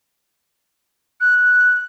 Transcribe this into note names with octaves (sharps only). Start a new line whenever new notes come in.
F#6